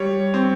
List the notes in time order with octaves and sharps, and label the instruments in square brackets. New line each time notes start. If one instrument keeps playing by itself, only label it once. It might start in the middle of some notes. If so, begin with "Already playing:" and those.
Already playing: [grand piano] G3 C#5
C4